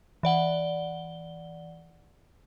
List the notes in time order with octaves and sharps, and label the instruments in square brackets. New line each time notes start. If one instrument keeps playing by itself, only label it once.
[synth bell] E3 D5 F#5 G7